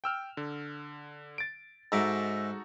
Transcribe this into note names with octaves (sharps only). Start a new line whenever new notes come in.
G5 E6 F6
D3
A6 D7
G#2 D#4 F#4 A4 E5 D6